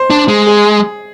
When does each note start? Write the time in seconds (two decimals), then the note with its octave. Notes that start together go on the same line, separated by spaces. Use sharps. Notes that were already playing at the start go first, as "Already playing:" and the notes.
Already playing: C5
0.10 D4
0.28 G#3
0.47 G#4